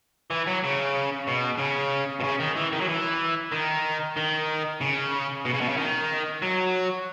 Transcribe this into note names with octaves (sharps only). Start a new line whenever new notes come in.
E3
F#3
C#3
B2
C#3
B2
C#3
D#3
E3
D#3
F#3
E3
D#3
D#3
C#3
B2
C#3
B2
C#3
D#3
F#3